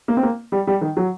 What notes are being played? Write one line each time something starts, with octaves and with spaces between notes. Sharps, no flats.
A#3
C4
A#3
G3
G3
D#3
F#3